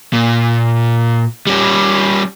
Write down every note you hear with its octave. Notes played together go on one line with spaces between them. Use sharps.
A#2
G3 C#4